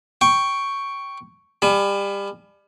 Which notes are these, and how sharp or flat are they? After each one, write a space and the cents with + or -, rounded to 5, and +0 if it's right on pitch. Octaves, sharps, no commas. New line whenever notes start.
G5 +0 C#6 +0
G3 +25 G#5 +45